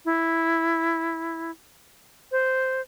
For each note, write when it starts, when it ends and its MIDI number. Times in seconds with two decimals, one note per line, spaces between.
0.05 1.51 64
2.32 2.81 72